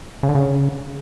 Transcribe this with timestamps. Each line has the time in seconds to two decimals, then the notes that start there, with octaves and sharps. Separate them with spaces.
0.23 C#3
0.29 D3
0.35 C#3